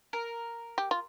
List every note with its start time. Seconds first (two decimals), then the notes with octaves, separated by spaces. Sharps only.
0.13 A#4
0.78 G4
0.91 F4